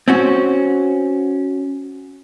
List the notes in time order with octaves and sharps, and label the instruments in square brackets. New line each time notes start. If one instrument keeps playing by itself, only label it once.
[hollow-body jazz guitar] C4 C#4 F#4